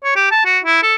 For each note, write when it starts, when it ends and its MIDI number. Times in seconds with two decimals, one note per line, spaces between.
0.04 0.15 73
0.16 0.28 67
0.31 0.42 81
0.45 0.59 66
0.64 0.79 64
0.83 0.95 69